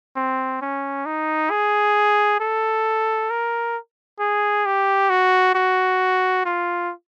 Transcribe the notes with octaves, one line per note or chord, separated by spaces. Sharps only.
C4
C#4
D#4
G#4
A4
A#4
G#4
G4
F#4
F#4
F4